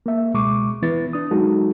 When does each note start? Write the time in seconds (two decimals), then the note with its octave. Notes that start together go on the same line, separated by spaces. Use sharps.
0.06 A#3 E5
0.34 C#2 B2 G#3 C#6 D6
0.82 E3 B3 E4 B4 A6
1.13 D4 D#6
1.31 F#3 G#3 D#4 F#4 G#4 A4